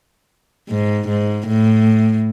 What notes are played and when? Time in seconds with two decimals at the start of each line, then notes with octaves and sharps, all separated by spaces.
0.70 G#2
1.09 G#2
1.48 A2